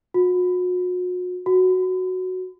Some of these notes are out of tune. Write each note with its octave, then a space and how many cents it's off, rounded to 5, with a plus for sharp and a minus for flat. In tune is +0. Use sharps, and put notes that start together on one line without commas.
F#4 -40
F#4 +0